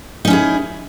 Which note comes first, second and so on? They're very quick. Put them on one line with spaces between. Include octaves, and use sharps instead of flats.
D#4 C#4 E4 G#4